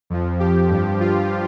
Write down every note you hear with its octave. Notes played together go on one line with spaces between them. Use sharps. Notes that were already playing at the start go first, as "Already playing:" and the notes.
F2 F3
G4
G2 F3
F4